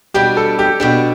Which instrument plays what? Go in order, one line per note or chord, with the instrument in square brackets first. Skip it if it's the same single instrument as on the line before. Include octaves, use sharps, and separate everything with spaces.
[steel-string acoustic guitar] B2 G3 D4 [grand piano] G4
[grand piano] A4
G4
[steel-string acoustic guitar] B2 G3 D4 [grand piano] G4